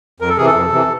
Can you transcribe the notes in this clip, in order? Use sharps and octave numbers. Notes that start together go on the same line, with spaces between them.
F2 A#4
A4
C3 E3 G#4
A4
F2
C3 E3